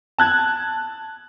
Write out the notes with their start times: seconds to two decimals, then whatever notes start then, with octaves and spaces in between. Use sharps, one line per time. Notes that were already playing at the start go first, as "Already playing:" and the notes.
0.18 A5 F#6 G#6